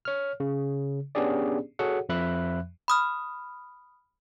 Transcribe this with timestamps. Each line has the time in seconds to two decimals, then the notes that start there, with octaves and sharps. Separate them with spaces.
0.05 C#5 F6
0.40 C#3
1.15 B3 C#4 D4 G4 G#4 D5
1.79 F#4 G#4 A4 C#5 F#5
2.09 F2 F3 E5 B5 F#6
2.88 B5 D#6 F6